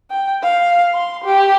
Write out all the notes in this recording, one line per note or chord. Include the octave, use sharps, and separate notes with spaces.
G5
F5
C6
G4